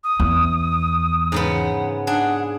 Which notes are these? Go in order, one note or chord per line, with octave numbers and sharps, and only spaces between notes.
D#6
E2
G#2 C#3 B3
D4 G#4 F#5